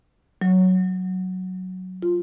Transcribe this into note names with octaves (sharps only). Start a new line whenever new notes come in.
F#3
F4